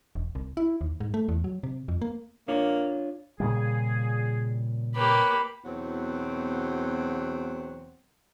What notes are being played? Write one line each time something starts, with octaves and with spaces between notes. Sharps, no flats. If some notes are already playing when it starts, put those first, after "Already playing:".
E1
C2
E4
D#2
G#2
A3
E2
F#3
C3
F2
A#3
A#3 D4 F4 C#5
A#2 C#3 G3 G#4
A#3 G4 B4 C#5 B5 D6
E2 B2 F#3 C4 F#5